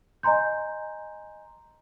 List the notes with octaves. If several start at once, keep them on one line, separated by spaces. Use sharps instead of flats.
D#5 G#5 A#5 C6 G6